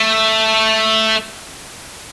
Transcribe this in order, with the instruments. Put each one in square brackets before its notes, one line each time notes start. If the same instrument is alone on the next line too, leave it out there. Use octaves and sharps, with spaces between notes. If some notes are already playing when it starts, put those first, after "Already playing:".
Already playing: [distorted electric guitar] A3